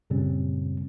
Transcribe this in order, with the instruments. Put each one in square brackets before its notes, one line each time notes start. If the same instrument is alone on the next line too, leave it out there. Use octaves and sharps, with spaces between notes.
[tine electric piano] F#2 A#2 C#3 G3 C4 C#4